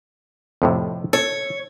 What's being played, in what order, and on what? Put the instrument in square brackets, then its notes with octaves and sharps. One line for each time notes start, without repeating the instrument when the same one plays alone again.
[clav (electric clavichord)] F2 A2 C3
[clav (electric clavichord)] A4 [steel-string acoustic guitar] C#5